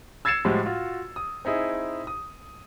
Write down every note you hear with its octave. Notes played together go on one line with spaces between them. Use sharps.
E6 G#6 A6 C7 C#7 E7
A2 F3 G3 G#3 F#4
F4 F#4
D#6
C4 D#4 E4 G#4
D#6